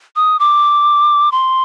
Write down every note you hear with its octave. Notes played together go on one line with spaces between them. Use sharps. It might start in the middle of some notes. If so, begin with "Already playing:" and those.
D#6
D6
C6